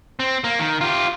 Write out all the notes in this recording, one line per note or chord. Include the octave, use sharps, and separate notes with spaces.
C4
A#3
D#3
F4 G4